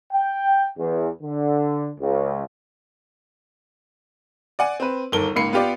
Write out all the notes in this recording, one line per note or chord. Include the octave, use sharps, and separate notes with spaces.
G5
E2
D3
C#2
D5 F#5 G#5
C4 B4
G1 D#2 A4 A#4 G7
C#2 G#2 A#3 B5 C7 C#7
B3 F4 G4 D5